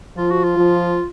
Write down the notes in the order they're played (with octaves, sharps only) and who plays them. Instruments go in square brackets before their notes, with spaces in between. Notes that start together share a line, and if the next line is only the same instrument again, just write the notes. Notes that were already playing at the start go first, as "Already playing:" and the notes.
[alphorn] F3 [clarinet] F4
[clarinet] F#4
F4
[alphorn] F3